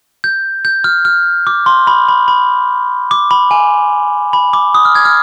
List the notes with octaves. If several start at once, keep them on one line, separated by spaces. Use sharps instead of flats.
G6
G6
F6
F6
D6
C6
B5
B5
B5
D6
B5
G#5
B5
D6
D#6
F6
G#6
F6